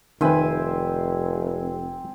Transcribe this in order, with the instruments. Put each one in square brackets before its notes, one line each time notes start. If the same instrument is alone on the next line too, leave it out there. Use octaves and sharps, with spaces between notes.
[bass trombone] F1 [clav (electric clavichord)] D#3 B4 [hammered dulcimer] C4 E5 G#5